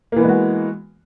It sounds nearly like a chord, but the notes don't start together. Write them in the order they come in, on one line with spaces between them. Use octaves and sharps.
A#3 E3 B3 G#3 F#4